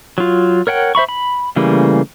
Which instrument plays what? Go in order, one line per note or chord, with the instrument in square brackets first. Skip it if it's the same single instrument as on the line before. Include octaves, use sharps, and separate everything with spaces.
[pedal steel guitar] F#3 F4
A#4 C#5 F#5 G5
C5 E5 B5 C#6
B5
C#3 E3 G3 A3 A#3